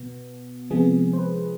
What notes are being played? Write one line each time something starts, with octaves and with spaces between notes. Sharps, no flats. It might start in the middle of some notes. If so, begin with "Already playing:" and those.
Already playing: B2 B3
C3 F3 G#3 B3 G#4
C5
B4